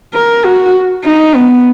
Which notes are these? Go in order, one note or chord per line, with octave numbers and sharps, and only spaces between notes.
A#4
F#4
D#4
B3